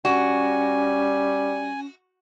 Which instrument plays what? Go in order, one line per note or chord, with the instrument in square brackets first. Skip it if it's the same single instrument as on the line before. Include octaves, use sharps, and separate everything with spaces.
[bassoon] G3 [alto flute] C#4 [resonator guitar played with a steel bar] F#4 [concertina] G#5